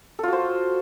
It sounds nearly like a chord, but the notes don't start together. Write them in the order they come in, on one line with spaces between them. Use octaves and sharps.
A4 F4 F#4 C5